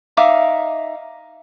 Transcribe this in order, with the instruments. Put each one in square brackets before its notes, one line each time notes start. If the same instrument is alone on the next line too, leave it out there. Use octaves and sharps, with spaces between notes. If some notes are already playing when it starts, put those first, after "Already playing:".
[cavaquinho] D#4 E5 F5 D6